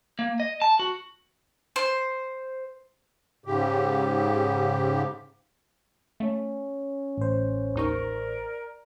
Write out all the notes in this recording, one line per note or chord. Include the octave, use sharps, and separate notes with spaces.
A#3
D#5
A5
F#4
C5
G#2 C#3 G4
A3 C#4
A1 C5
D#2 D#4 A#4 D5 C#6